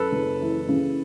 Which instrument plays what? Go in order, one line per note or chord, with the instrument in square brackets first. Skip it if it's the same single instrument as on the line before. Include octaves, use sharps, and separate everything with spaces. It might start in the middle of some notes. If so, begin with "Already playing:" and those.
Already playing: [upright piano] F#2 [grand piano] A4 B4
[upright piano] F#1
E3
C#3